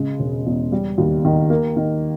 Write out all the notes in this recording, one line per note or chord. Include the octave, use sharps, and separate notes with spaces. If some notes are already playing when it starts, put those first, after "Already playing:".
Already playing: C#3 G#3
E1
E2
G3
D#2
D#3
A#3
D#3